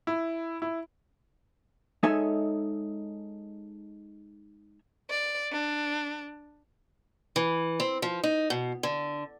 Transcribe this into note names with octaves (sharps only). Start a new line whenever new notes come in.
E4
E4
G#3 D#4 A4 C#5 E5 G#5
D5
D4
E3
C4
F3
D#4
B2
D3